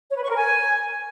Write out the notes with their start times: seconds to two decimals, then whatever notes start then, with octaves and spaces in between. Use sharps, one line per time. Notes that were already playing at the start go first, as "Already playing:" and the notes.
0.10 C#5
0.17 B4
0.23 C#6
0.29 A#4
0.36 G#5